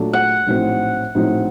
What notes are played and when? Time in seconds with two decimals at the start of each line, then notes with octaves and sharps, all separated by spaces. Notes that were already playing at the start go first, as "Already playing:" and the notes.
Already playing: A#2 F#3 A3 D4 A4
0.13 F#5
0.47 A#1 A2 F#3 C4 D#4
1.15 A#1 A2 F#3 C4 D#4